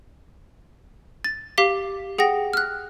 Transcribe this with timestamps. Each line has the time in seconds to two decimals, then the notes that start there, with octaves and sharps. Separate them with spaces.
1.24 A6
1.58 G4 F5 D6 B6 G7
2.18 G#4 F#5 G5 A#6
2.53 F6 F#6